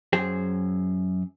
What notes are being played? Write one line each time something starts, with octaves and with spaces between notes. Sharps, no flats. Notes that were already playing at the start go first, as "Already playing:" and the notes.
F#2 G#4 C5 G5